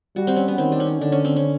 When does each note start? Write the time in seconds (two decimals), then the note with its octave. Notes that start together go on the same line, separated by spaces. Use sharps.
0.16 G3 F#4
0.27 C4
0.36 C#4
0.48 B3
0.58 D#3 C4
0.72 D4
0.80 C#4
1.01 D3 D4
1.12 C#4
1.25 C4
1.36 C#4